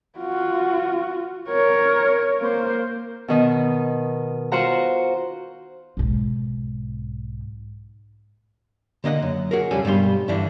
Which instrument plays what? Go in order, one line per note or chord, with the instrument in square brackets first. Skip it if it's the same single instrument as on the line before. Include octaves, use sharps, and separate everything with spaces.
[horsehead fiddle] F4 F#4
A#4 C#5
A#3 C5
[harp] B2 D#3 D#4
F4 F#4 C5 F#5 A#5
[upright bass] B1 G#2
[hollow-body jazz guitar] D3 A#3 D#5 F#5
F#2
F#4 G#4 A#4
C2 F2 C#3 G3 G#4 A4
G2 B2 G3 C6
G2 D3 E3 D4